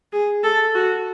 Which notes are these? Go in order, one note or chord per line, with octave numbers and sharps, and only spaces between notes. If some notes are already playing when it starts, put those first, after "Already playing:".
G#4
A4
F#4